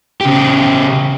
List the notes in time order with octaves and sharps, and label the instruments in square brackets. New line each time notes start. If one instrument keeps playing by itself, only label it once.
[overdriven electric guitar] C#3 G4